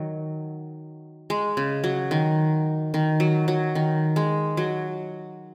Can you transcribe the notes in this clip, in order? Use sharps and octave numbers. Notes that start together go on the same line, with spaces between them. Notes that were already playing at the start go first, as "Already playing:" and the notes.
Already playing: D#3 F#3
G#3
C#3
F#3
D#3
D#3
F#3
F#3
D#3
G#3
F#3